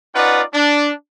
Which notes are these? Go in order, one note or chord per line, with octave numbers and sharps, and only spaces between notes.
C#4 D#4 F4 B4 D5 F#5
D4